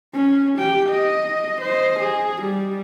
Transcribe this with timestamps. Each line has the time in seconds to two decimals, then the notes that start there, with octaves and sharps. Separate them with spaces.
0.13 C#4
0.58 G4 G5
0.90 D#5
1.62 C5 D#5
2.00 G#4
2.43 G3